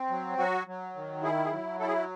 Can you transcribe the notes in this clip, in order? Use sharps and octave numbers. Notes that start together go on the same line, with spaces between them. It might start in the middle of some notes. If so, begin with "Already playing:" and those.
Already playing: C4
F#3
F#3 F#4
F#3
D#3
E4 G#4
G#4
F#3
E4 A4
G#4